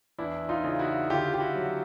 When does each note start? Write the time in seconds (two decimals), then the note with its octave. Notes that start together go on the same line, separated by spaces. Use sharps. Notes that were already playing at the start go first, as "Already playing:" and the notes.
0.18 E2 D4 E4
0.49 D#4 F4
0.64 C#3
0.79 E4 F#4
1.10 D3 F4 G4
1.34 G4
1.40 E4 F#4
1.55 F#3